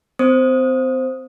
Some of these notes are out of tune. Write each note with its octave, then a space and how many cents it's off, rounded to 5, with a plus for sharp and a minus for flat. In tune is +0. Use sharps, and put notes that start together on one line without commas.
C4 -40 C5 +0 D#6 +0